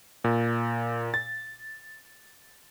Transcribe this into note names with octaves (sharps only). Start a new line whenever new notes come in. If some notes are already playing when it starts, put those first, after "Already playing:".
A#2
A6